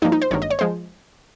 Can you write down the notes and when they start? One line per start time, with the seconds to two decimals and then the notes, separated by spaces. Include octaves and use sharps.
0.02 G2 D#4
0.05 F3 A#3
0.12 D#4
0.22 C5
0.31 G#1 G2 D#3 A#3 C#5
0.42 D#5
0.50 C#5
0.59 F3 G#3 C5